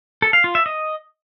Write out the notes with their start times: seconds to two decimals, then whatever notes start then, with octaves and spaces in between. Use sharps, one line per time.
0.22 A4
0.33 F5
0.44 F4
0.55 E5
0.66 D#5